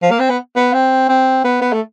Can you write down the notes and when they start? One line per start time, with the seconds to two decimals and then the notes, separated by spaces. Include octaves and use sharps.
0.02 F3
0.11 A#3
0.19 C4
0.29 B3
0.56 B3
0.73 C4
1.09 C4
1.44 B3
1.61 B3
1.73 A3